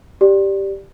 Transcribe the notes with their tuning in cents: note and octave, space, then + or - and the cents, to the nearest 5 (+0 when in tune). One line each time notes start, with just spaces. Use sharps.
G4 +0 D5 +0